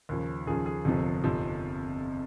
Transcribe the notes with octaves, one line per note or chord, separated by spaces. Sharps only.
D#2 C#3 F3
D#2 C#3 F3 G#4
G#4
G1 F2 C3 F3
G1 F2 C3 F3